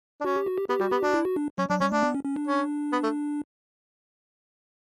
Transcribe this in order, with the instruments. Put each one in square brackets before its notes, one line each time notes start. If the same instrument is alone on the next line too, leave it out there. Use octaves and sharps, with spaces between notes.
[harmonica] D4
[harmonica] C#4 [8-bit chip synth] F#4
[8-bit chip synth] G4
F#4
G4
[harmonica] B3 [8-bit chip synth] G4
[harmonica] G3 [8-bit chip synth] F#4
[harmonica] B3 [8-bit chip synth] G4
[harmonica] D4 [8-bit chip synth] F#4
[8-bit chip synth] E4
F#4
D4
[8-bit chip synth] F#3 [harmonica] C#4
[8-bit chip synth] F#3 [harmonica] D4
[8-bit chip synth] G3 [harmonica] C#4
[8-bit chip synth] A3 [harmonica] D4
[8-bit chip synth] B3
C#4
C#4
D4
[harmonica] C#4
B3
A3